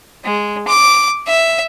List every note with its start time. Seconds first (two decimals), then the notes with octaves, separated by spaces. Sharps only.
0.25 G#3
0.67 D6
1.27 E5